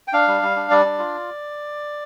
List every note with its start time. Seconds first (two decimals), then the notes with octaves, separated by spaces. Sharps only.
0.08 G5
0.13 D4 F5
0.27 G3
0.42 G3
0.56 D4
0.70 G3 D5
0.85 D4
0.98 F4